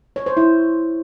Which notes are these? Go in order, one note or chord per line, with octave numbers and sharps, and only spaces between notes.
C#5
C5
E4